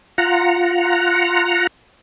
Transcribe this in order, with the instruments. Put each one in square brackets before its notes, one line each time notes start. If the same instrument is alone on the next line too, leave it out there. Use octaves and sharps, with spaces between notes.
[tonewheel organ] F4 F#5 A#5